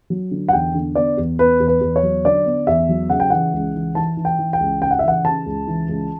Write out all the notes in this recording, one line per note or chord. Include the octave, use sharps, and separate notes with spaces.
F#3
D3
F#5
E2 G5
D3
B3 D5
E2
B3 B4
E2
B4
E2
C#5
F#3
D3 D5
B3
E2 E5
F#3
C#3 F#5
G5
E3 F#5
C#2
E3
E3 A5
E3
G5
E3
G5
C#2
C#3 G5
F#5
E5
E3 F#5
C#3 A5
C#2
E3
C#2